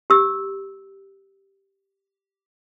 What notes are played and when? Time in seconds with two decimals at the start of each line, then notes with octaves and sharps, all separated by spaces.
0.10 G4 E6